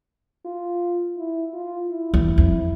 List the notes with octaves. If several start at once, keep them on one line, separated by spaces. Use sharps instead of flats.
F4
E4
F4
E4
E2
F2